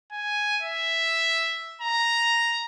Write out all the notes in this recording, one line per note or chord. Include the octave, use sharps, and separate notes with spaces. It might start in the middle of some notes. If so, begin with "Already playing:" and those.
G#5
E5
A#5